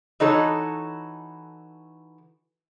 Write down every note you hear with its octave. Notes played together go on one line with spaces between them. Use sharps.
E3 D#4 F#4 A4 C#5